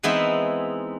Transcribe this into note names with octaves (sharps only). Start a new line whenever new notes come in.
E3 G#3 B3 C4 D#4 E4